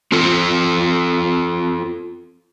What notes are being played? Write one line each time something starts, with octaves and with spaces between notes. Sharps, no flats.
C4 F4 A4